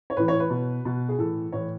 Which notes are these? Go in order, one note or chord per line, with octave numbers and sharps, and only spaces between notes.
C#5
A2 E3 B4
C#5
B4
B2
B2
G#4
A2 E3 A4
A2 E3 C#5